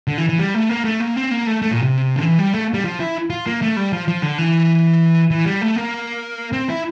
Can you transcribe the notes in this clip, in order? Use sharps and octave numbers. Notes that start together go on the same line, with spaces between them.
D3
E3
E3
G3
A3
A#3
A3
A#3
C4
A#3
A3
A3
A#2
C3
D3
E3
G3
A3
G3
F3
E4
F4
A#3
A3
G3
F3
F3
D3
E3
E3
G3
A3
A#3
C4
E4